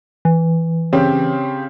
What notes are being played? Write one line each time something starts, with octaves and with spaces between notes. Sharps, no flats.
E3
C#3 C4 G4